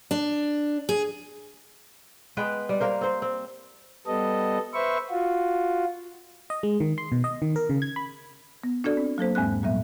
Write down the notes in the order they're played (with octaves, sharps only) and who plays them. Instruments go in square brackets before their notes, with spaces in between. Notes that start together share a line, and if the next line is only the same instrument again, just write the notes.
[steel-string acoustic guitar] D4
G#4
[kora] G#3 B3 B4 G5
G3
A#3 A#4 C5
C4 C5
C4
[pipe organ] G3 B3 A4 D#5
B4 C5 E5 C#6
F4 F#4
[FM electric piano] D#5
G#3
D#3
C6
B2
D#5
D#3
A#4
C#3
G#6
B5
[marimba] B3
D4 F#4 A4 D5
C4
F#3 A#3 A4 C5
E2 G#2 G#3 C4 F#6
A#2 F#3 G3 B3 E5